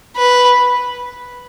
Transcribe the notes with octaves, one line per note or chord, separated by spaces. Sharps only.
B4